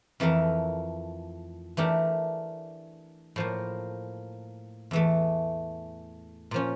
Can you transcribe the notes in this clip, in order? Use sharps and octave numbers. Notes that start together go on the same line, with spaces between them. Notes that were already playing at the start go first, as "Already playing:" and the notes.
F2 E3 A3 E4 A#4
E3 A3 D4 G4 A#4
A2 F3 A#3
E2 E3 A3
A#2 F3 C#4